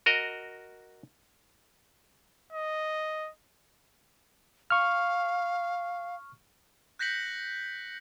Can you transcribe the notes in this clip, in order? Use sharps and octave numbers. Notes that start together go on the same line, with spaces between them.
F#4 A#4 D#5
D#5
F5 C#6 F6
F#6 G6 A#6 B6 C#7 F#7